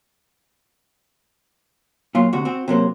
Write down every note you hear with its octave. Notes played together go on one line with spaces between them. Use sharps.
A#2 F#3 F4
D2 C3 F#4
C4 F#4
C3 F#3 A#3 C5